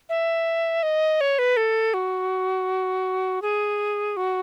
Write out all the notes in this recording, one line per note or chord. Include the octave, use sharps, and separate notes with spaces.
E5
D#5
C#5
B4
A4
F#4
G#4
F#4